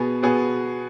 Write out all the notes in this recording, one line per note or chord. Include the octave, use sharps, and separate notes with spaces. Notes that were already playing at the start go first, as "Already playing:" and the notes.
Already playing: B2 B3 G#4
B2 B3 G#4